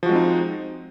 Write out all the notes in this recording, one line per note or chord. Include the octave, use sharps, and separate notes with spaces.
F3 G#3 C4 D#4 F#4